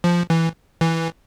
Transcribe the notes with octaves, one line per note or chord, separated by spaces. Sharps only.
F3
E3
E3